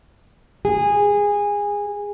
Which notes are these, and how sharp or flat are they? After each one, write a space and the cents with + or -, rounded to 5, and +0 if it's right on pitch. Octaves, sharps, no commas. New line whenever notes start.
G#4 -20